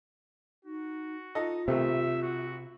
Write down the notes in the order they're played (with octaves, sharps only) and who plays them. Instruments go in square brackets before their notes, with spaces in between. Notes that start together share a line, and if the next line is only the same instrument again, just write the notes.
[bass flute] D#4 [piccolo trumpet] F#4
[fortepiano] D#4 A4 D#5 [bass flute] F4
[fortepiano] B1 D#3 A3 [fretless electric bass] C3 [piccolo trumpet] E5
[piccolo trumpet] F#4